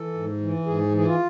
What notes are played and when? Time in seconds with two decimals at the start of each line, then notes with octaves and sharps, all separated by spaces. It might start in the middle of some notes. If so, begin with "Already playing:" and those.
Already playing: E3 A4
0.14 G#2
0.40 E3
0.66 G#2 G#4
0.93 E3 G#4
1.06 F4